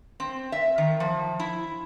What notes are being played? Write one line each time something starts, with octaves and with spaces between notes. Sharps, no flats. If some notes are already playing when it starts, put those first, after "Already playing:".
C4
E5
D#3
F3
E4